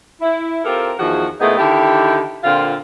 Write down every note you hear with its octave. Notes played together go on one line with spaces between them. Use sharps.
E4
C4 F4 G4 A4 A#4
E2 D#3 F3 D#4 F#4 G#4
A#2 A3 B3 D#4 E4 G#4
D3 D#3 E4 G4
A#2 D3 C4 F4